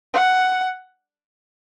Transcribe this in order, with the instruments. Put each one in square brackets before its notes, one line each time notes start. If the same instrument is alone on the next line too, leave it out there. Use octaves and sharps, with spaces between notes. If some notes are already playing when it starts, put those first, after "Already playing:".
[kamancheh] F#5